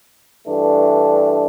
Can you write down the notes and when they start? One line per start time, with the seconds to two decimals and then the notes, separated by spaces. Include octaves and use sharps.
0.46 G2 E3 A3 D4 A4